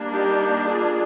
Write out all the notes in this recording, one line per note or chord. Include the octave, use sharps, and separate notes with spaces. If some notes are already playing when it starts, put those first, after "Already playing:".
Already playing: G3 A#3 D4
D#4 G4
F4 G#4